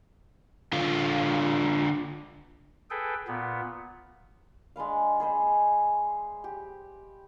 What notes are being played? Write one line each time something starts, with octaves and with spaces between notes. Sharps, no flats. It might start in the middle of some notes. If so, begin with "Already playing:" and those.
D3 F4
G#4 A4 B4 G5
A#2 B3
G#3 D4 B4 F5
G#4 B4 C5 D#5
G4